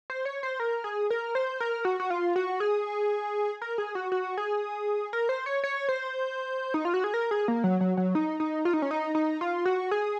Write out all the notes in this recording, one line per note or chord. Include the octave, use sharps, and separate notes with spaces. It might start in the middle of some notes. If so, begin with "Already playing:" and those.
C5
C#5
C5
A#4
G#4
A#4
C5
A#4
F#4
F#4
F4
F#4
G#4
A#4
G#4
F#4
F#4
G#4
A#4
C5
C#5
C#5
C5
D#4
F4
F#4
G#4
A#4
G#4
A#3
F#3
F#3
F#3
D#4
D#4
F4
D#4
C#4
D#4
D#4
F4
F#4
G#4